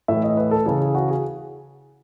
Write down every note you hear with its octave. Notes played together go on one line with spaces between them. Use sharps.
A2 E3 E5
D#5
B4
A4
C#3 E3 G#4
G#4
F#4
G#4